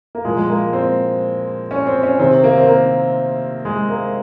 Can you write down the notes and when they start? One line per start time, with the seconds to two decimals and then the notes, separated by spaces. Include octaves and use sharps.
0.15 A#3
0.25 A#2 F3 G#3
0.37 G#3
0.49 A#3
0.73 C4
1.71 C#4
1.87 C4
2.03 C#4
2.19 C3 D#3 C4
2.44 A#3
2.58 C4
2.68 A#3
3.65 G#3
3.90 A#3